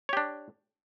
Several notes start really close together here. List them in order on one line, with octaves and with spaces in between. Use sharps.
C#5 G4 D4